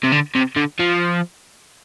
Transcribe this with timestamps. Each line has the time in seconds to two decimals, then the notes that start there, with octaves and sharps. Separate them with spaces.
0.03 C3
0.12 D3
0.35 C3
0.56 D3
0.79 F3